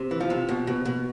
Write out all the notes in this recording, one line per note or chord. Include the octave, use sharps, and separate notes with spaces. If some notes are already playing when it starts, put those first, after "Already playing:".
Already playing: C3
E3
F3
C3
B2
B2
B2